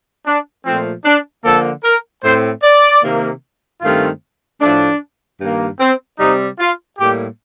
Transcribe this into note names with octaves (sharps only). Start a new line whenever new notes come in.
D4
A#2 F3 A3 C4
D4
D3 F3 A#3 A4
A#4
A2 A3 C4 C5
D5
C3 D#3 A#3
G2 D#3 A3 C4 F4
A2 F3 A3 D4
G2 D#3 A#3
C4
C3 G3 C4 D#4
F4
A2 G3 A#3 G4